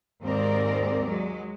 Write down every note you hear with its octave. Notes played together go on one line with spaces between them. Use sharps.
D#2 G#2 C4 A#4 D5
F#3 G#3